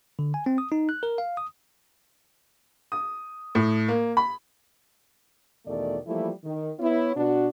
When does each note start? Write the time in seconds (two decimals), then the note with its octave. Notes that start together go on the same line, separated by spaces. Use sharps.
0.19 D3
0.34 G#5
0.46 C4
0.58 D#6
0.72 D#4
0.89 F#6
1.03 A#4
1.18 F5
1.37 D#6
2.92 D#6
3.55 A2
3.88 A#3
4.17 B5
5.66 E2 B2 D#3 A3 D5
6.07 E3 F3 G3 A3 A#3 E4
6.44 D#3
6.80 B3 E4 C#5
7.16 B2 D4 F#4